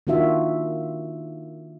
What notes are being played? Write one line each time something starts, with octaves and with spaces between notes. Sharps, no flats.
D#3 A#3 D4 F4 F#4 E5